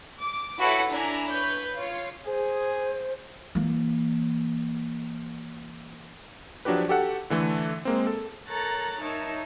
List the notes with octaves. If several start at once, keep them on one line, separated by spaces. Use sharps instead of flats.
D6
E4 F#4 A4 B4 C#5 F#5
D4 E4 G#5 A#5
B4 C#5 G6
F4 C#5
G#4 C5
E3 A#3
F3 F#3 D4 F#4 G4 B4
F#4 G4 A4 F#5
D3 E3 A3 A4
G#3 A#3 C4
A4
A4 A#4 C#5 A#5 F#6 A6
D#4 A#4 C#5 E5 A5